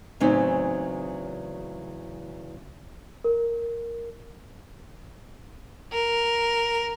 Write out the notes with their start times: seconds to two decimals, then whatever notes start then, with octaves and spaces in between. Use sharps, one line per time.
0.20 E2 A2 C#3 F#3 C4 D#4
3.24 A#4
5.93 A#4